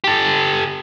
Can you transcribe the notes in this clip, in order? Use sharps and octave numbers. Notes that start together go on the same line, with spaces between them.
G4 A4